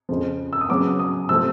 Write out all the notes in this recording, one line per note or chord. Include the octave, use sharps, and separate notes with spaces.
F2 C#3 F3
E6
D#6
C#3 F#3 B3 D6
D#6
C3 F3 A3 E6